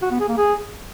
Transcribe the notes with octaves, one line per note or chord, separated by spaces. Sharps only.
F#4
B3
G#4
A#3
G#4